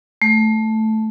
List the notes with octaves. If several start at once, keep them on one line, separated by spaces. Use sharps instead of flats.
A3